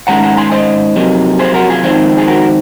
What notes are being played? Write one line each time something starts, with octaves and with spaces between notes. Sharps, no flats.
G#2 D#3 G#3 C#4 F#5 A#5
F#5 A#5
G#5 C6
C5 D#5
F2 C3 F#3 A#3 D#4
G#4 C5
F#4 A#4
F4 G#4
F2 D#3 G#3 C4
G#4
F#4 A#4